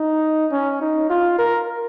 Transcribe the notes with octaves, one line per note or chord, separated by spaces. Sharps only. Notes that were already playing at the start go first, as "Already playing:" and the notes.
Already playing: D#4
C#4
D#4
F4
A#4